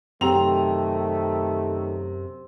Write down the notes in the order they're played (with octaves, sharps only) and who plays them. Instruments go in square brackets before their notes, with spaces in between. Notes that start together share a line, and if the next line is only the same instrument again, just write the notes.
[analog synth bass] F#2 [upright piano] C3 A#5 F7 [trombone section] D#3 A3 [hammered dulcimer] C4